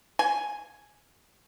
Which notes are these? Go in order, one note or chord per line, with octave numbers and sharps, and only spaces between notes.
G#5